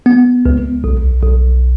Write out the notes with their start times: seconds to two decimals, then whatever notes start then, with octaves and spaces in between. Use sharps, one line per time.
0.06 B3
0.46 C#2
0.84 B1
1.23 B1